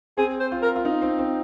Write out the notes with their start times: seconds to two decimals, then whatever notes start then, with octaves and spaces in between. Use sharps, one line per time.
0.18 C4 G#4
0.40 C5
0.52 F4
0.62 A#4
0.76 F4
0.85 D#4
1.02 C4
1.19 C4